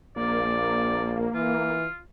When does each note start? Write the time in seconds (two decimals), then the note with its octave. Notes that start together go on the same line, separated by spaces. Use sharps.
0.16 A#1 A#3 D5
1.34 E3 F4